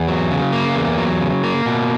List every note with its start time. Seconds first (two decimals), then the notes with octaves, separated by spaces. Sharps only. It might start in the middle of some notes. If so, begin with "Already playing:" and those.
Already playing: E2
0.08 F#3
0.31 C#3
0.53 A#3
0.76 E2
0.98 F#3
1.20 C#3
1.44 A#3
1.66 B2